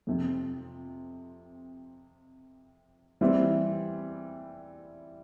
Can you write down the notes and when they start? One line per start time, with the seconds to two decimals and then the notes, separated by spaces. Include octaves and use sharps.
0.07 F2 C3 F3
3.21 E3 G3 C4 E4